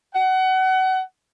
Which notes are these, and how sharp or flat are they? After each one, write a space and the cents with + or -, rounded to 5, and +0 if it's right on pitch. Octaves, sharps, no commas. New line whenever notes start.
F#5 +25